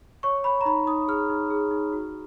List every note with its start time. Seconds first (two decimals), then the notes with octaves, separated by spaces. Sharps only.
0.23 C#5 C#6
0.44 C#5 B5
0.61 A#5
0.65 D#4 B5
0.87 D#4 D#6
1.08 G#4 F6
1.30 D#4
1.50 G#4
1.71 D#4
1.93 F#4